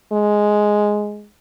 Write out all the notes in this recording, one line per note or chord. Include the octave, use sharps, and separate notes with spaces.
G#3